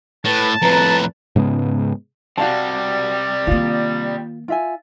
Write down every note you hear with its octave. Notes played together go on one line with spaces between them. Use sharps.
A2 B4 A5
F2 A2 B4 A#5
G#2 C#3 G#3 B3
C3 G3 F#4 D5 F5 A5
D#3 A#3 F4
F4 E5 G#5